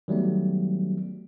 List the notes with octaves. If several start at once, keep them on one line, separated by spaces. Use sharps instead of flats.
D#3 F#3 G3 A3 B3